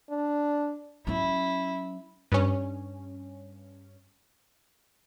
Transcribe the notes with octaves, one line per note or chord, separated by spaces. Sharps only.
D4
F#3 C#4 E4
G2 C#4